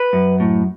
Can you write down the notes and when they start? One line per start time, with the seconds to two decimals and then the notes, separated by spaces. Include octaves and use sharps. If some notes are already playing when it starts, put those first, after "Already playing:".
Already playing: B4
0.13 F#2
0.40 A2